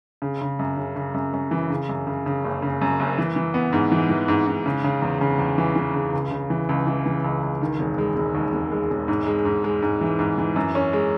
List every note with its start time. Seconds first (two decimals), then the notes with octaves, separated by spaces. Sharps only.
0.22 C#3
0.41 C#3
0.59 F#2
0.77 C#3
0.96 C#3
1.14 F#2
1.33 F#2
1.51 E3
1.70 C#3
1.89 F#2
2.07 C#3
2.26 C#3
2.45 F#1
2.62 C#3
2.81 F#2
3.00 F#1
3.18 E3
3.36 E3
3.54 B3
3.73 G#2
3.92 E3
4.10 E3
4.28 G#2
4.47 G#2
4.66 C#3
4.84 C#3
5.02 E2
5.21 C#3
5.39 E2
5.58 E3
5.76 E3
5.95 C#3
6.13 C#2
6.31 C#3
6.50 E3
6.69 C#2
6.87 E3
7.06 E3
7.24 C#2
7.43 C#2
7.61 D#3
7.79 E1
7.98 G#3
8.16 E1
8.35 D#2
8.53 E1
8.72 G#3
8.90 E1
9.08 G#2
9.26 G#3
9.45 G#2
9.64 G#3
9.82 G#2
10.01 E3
10.19 G#2
10.38 E3
10.56 F#2
10.75 C#4
10.93 G#3